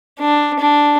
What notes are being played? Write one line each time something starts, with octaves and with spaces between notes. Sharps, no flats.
D4
D4